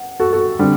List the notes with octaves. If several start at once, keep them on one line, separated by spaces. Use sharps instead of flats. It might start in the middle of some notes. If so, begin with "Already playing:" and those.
Already playing: F#5
F#4 A4
F#4 A4
D3 G3 C4